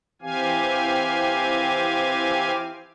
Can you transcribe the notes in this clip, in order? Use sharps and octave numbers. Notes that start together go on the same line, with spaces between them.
E3 C4 G4 F5 G#5